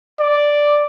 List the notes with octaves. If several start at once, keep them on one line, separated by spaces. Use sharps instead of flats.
D5